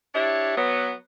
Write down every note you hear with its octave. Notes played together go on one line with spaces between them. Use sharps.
D4 E4 G4 C#5
F#3 B3